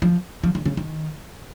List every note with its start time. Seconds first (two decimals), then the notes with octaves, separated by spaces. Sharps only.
0.02 F3
0.44 F3
0.55 D#3
0.66 C#3
0.77 D#3